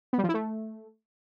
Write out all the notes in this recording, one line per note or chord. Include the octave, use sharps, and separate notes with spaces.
B3
G3
F3
E4
A3